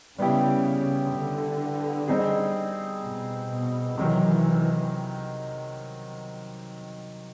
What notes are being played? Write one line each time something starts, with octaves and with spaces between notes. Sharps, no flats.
C#3 G3 B3 E4 G4
D3
G3 C4 D#4 G#4
B2
B2
C3 D#3 E3 F#3